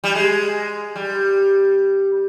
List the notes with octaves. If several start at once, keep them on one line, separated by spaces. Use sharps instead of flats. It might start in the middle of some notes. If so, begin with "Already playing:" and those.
G3
G#3
G3